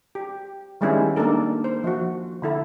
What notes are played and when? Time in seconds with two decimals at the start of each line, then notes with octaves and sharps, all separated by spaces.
0.15 G4
0.81 D#3 G3 G#3 B3 C#4 E4
1.16 A#3 D4 D#4 A4 A#4
1.64 C5
1.84 F3 F#4
2.42 D3 E4 A4